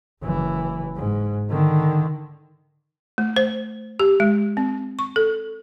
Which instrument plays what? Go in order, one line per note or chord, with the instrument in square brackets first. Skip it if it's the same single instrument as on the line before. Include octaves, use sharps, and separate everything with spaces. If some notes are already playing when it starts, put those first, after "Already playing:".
[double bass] F#1 E3
G#2
D3 D#3
[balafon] A3
C5
G4
G#3
C4
C#6
A4